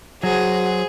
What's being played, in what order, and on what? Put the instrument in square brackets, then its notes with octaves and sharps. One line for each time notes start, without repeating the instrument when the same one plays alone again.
[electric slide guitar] F#3 [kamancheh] F#4 [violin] G#4 [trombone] C5